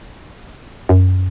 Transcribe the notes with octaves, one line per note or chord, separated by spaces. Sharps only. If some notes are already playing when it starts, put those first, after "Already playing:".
F#2